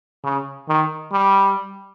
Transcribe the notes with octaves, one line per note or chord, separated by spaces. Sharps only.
C#3
D#3
G3